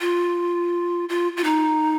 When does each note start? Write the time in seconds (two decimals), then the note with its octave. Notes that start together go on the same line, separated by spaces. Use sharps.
0.01 F4
1.09 F4
1.37 F4
1.44 D#4